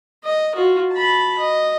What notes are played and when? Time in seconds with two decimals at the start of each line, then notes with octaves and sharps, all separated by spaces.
0.24 D#5
0.55 F4 F#4
0.92 A5 B5
1.38 D#5